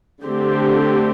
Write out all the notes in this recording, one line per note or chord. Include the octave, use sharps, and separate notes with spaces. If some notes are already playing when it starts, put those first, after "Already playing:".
D3 A3 C4 G4